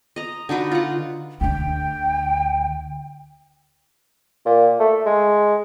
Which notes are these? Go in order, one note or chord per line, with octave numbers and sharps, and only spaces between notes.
D#5 A#5
D3 D#4 F#4 B4
F4 F#5
D2 D3 G5
A#2
A3
G#3